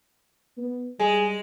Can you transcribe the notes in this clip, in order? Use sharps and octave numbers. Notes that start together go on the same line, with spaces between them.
B3
G3 G#3 G#4